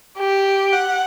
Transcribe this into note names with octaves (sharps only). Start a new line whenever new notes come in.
G4
F#5